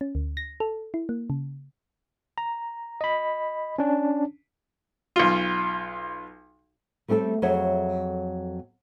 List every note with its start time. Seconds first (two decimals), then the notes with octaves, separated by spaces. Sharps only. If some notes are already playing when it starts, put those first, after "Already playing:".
0.01 C#4
0.15 D2
0.37 A#6
0.60 A4
0.94 E4
1.09 A#3
1.30 C#3
2.38 A#5
3.01 D#5 B5
3.79 C#4 D4
5.16 B1 F4
7.08 G3 A3 C4 G4 A4
7.42 F2 F#3 G#4 C#5 E5